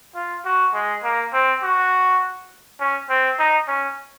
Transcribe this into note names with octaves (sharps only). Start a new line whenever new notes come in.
F4
F#4
G#3
A#3
C4
F#4
C#4
C4
D#4
C#4